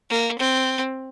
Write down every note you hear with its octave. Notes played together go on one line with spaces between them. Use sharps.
A#3
C4